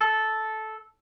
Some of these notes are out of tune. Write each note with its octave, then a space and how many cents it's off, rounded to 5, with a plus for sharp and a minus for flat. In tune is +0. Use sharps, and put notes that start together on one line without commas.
A4 -10